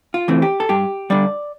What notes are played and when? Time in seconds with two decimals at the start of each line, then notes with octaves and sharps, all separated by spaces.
0.14 F4
0.28 E3 A3 C4
0.42 G4
0.60 A4
0.69 G2 G4
1.10 D3 G3 D5